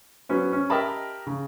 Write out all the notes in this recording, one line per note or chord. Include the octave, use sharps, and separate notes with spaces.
F#3 B3 C#4 C5
C#4
G4 A#4 D#5 E5 A5 B5
C#3